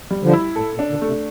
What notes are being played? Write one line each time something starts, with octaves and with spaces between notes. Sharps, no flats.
G3
D3 F3
E4
A2 A4
A#2
D4
A#2 D3
A3
C3